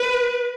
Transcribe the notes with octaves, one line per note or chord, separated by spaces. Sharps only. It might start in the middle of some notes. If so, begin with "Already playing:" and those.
Already playing: B4